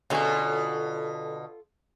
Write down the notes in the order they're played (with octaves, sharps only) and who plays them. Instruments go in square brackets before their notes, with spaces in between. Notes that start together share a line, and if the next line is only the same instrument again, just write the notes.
[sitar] B2 D3 [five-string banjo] F#3 C#4 G#4 [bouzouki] F4 A4